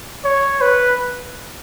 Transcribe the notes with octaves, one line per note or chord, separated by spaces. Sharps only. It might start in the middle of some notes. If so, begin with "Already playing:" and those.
C#5
B4